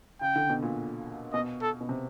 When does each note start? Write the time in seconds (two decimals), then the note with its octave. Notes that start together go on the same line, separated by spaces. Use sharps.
0.21 C#3 G5
0.36 D3
0.50 B2
0.63 A#2
1.33 B2 D#5
1.62 A4
1.81 B2
1.89 C3